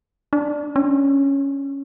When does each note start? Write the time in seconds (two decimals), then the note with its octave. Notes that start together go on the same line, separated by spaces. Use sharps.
0.33 D4
0.76 C#4